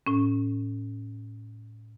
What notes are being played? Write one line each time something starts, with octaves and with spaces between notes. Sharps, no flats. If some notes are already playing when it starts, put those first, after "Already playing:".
A2 C#4